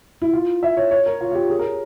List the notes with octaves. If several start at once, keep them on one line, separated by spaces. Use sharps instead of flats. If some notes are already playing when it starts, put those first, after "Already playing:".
E4
F4
E5
C#5
C#5
A#4
F4
F4
G4
G#4
A#4